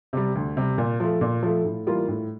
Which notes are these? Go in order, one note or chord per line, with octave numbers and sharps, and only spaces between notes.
C3 G3
D2
C3 G3
A#2
F3 A3
A#2
F3 A3
A2
E3 G3 A#3 F4
A2